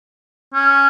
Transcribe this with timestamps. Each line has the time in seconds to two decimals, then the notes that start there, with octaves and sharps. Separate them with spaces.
0.54 C#4